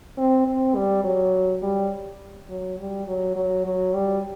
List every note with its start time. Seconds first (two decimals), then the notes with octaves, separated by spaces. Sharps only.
0.18 C4
0.47 C4
0.75 G3
1.04 F#3
1.63 G3
2.49 F#3
2.79 G3
3.07 F#3
3.36 F#3
3.66 F#3
3.94 G3